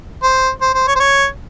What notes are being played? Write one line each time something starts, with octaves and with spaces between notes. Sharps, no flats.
C5
C5
C5
C#5
C5
C#5